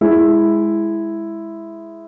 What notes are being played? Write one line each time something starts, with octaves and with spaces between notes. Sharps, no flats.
G#3 E4